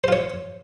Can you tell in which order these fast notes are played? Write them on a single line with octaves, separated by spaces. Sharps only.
C5 F4 C#5